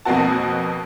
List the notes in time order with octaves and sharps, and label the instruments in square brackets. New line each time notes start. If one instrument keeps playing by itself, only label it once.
[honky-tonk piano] F2 B2 A#3 C4 F#4 A5